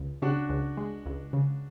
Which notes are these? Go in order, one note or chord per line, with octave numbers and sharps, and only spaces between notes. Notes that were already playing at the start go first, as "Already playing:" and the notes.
Already playing: C#2
C#3 D4 F#4
C#2
G#3
C#2
C#3